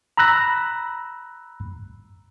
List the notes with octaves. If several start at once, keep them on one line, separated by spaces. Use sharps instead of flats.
A#5 B5 E6 F#6 A#6